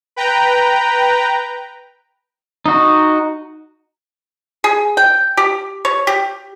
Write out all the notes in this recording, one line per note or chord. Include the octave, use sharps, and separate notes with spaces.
B4 G5 A#5
D#4 F#4
G#4
G5
G4
C#5
G4